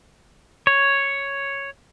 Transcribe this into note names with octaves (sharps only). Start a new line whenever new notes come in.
C#5